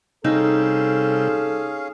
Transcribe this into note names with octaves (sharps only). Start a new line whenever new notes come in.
C3 G3 C#4 D#4 G#4 A4 F5 E6